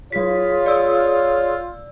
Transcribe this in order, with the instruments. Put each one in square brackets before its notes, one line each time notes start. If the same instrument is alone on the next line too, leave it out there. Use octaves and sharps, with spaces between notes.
[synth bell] F#3 B6 [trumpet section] F4 [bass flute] G#4 [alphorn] C#5
[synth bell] D5 E6